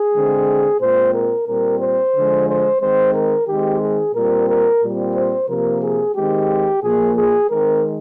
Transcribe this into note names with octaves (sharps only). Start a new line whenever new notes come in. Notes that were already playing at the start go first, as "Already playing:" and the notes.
Already playing: G#4
D3 G#3 C4
A#2 G#3 C4 C5
A#4
A#2 G3 C4 A#4
C5
D3 F3 G#3
C5
D#3 G#3 C4 C5
A#4
D#3 G#3 C4 G4
G#4
A#2 G3 C4 A#4
A#4
A#2 G3 C4
C5
C3 F3 A#3 A#4
G#4
D#3 G#3 C4 G4
A#2 F3 A#3 G#4
G#4
D#3 G#3 C4 A#4